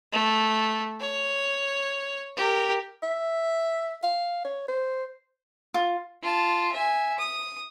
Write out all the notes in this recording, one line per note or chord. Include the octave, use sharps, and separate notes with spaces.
A3
C#5
G4 A#4
E5
F5
C#5
C5
F4
F4 A5
E5 G#5
D#6